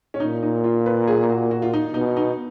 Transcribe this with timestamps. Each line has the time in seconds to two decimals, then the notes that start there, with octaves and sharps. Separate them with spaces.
0.14 C#4
0.20 A#2 D#4
0.43 D#4
0.64 F4
0.86 B4
1.08 G#4
1.29 F#4
1.51 F#4
1.62 F4
1.73 D#4
1.94 B2 D#4
2.17 D#4